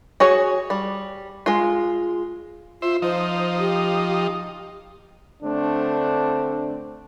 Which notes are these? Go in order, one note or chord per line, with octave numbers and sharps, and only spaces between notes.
F#4 G#4 C#5
G3
G#3 F4
F4 C5 E5
F3 D#4 C5
G4
D3 A3 C4 D4